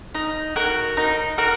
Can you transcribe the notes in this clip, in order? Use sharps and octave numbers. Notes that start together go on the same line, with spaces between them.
D#4
F#4 A#4
D#4
F#4 A#4